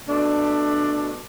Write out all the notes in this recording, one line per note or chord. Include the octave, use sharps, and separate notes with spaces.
B2 A3 D4